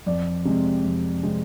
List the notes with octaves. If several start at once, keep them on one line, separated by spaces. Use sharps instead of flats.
F2 D5
C3 G#3 C4
F2
C3 G#3 C4